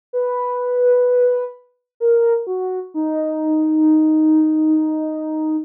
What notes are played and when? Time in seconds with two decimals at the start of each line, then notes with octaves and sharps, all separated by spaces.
0.13 B4
2.00 A#4
2.47 F#4
2.94 D#4